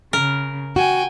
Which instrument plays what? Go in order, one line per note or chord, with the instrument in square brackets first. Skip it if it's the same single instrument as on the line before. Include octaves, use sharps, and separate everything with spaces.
[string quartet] C#3 [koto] A#4
[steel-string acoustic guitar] F#4 [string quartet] G5 G#5